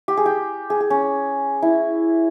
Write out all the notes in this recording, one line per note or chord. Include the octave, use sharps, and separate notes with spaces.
G4
G#4
G4
G#4
G#4
C#4
E4